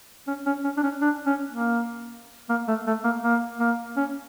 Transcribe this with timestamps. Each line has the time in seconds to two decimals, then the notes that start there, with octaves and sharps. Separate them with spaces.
0.27 C#4
0.46 C#4
0.64 C#4
0.77 D4
0.83 C#4
1.01 D4
1.26 C#4
1.51 A#3
2.49 A#3
2.68 A3
2.87 A3
3.04 A#3
3.24 A#3
3.59 A#3
3.97 C#4